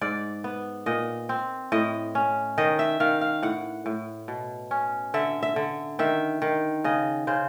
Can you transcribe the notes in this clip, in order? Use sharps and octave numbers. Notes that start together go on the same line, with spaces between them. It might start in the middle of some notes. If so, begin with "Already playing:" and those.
G#2 D5
B3
A#2 D#5
C4
A2 D#5
C#4
D#3 D#5
E5
D#3 F5
F5
A2 F#5
A2
B2
C#4
D3 E5
E5
D3
D#3 E5
D#3
C#3 D#5
C#3 C5